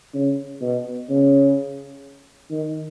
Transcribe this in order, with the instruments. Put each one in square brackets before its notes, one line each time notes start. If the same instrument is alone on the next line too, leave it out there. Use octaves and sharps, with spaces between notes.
[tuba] C#3
B2
C#3
D#3